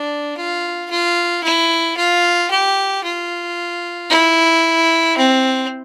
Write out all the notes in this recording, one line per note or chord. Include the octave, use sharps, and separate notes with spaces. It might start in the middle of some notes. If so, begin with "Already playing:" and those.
Already playing: D4
F4
F4
E4
F4
G4
F4
E4
C4